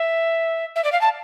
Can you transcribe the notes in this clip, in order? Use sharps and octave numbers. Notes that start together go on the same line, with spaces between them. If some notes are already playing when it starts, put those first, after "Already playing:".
Already playing: E5
E5
D5
F5
A5